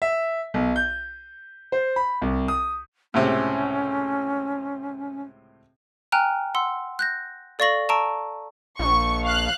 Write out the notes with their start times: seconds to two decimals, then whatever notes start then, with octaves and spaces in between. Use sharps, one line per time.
0.02 E5
0.54 B1
0.76 G6
1.72 C5
1.96 B5
2.22 C2
2.48 D#6
3.14 C#2 A2 C3 C#4
6.12 G5 G#5 A#5 F6 F#6
6.55 F#5 C6 E6
6.99 F#6 G6 A#6
7.59 A4 D5 F5 C#6 A#6 F#7
7.89 A5 A#5 C#6 E6 D7
8.79 A#1 C#6
9.25 F5 F#6